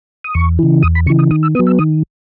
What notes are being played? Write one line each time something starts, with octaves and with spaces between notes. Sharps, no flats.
D#6
E2 C#6
C#3 E3
E2 D#6
B5
C#3 E3 C#6
D#6
D#3 D#6
E6
F#3 B3 D#6
E6
D#3 D#6